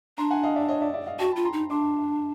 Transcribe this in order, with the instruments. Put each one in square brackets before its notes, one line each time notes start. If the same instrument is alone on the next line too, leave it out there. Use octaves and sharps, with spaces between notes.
[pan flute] D4 [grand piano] A#5 C6
[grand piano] F#5 G#5
D#5 F5
D5 E5
C#5 D#5
D5 E5
D5 E5
D#5 F5
[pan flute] F#4 [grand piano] G5 A5
[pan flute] F4 [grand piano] A5 B5
[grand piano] A#5 C6
[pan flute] D#4
[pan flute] D4 [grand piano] C6 D6